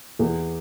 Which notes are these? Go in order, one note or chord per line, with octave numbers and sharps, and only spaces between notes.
E2